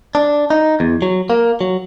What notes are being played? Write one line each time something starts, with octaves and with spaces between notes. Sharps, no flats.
D4
D#4
E2
F#3
A#3
F#3